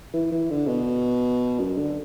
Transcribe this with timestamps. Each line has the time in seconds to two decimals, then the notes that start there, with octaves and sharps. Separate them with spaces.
0.14 E3
0.32 E3
0.50 D3
0.68 B2
1.60 F#2
1.78 D3